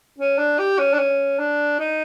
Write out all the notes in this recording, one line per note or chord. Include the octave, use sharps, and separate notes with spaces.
C#4
D4
G4
C#4
D4
C#4
D4
D#4